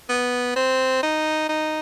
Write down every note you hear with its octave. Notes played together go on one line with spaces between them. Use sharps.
B3
C4
D#4
D#4